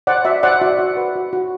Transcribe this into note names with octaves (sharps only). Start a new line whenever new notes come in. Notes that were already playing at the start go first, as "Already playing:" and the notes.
C5 D5 F#5
F#4 E5
C5 D5 F#5
F#4 E5
F#4
B4
F#4
F#4